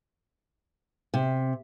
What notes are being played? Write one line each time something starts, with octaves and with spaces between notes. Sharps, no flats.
C3